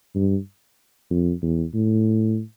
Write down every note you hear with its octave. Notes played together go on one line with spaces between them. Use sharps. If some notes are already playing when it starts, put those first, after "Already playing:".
G2
F2
E2
A2